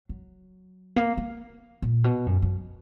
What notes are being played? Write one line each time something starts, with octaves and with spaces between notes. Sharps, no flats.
F#3
A#3
A#3
A#2
B2
F#2
F#2